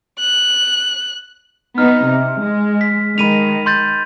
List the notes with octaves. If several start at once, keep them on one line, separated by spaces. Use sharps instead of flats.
F#6
B3 D#4 F6
C3
G#3
B6
D#3 G#3 B5 D#7 F7
C6 G6 A6